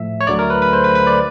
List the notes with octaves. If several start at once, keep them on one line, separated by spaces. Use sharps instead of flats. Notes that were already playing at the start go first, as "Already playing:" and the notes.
Already playing: A2 F3 A3 E5
C#5
D2 D3 F#3 A3 D5
A#4
B4
B4
C5
B4
B4
D5